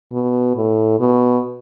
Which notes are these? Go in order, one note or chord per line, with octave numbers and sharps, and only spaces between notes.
B2
A2
B2